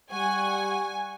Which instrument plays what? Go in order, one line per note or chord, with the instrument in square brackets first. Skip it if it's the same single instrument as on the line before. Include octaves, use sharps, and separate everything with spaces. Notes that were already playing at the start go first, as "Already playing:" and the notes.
[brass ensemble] G3 [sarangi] F#5 [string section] G#5 [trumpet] C#6